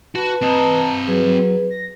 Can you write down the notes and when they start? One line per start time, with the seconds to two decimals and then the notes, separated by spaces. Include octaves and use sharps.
0.15 F#4 B4 A5
0.42 C4 D#5 A5 A#5
1.07 F#3 G#4 B4
1.25 F#3
1.70 A#6